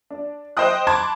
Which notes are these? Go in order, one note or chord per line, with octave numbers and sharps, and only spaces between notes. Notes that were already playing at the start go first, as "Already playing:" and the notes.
D4
C5 D#5 G5 D#6 F#6
A5 B5 C6 D6 G#6